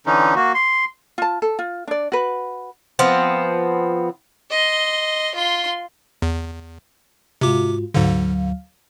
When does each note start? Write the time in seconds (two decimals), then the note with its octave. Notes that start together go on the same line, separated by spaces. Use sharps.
0.06 D3 E3 C#4 D#4
0.36 A#3 F#4
0.55 C6
1.18 F4 A5
1.42 A4
1.59 F4
1.87 D4 D5
2.12 F#4 B4
2.99 F3 B3 C4
4.51 D#5 C6
5.35 F4 C6
6.22 E2
7.41 G#2 C3 F4 F#4 D6
7.94 D2 G#2 D3 F#3 F5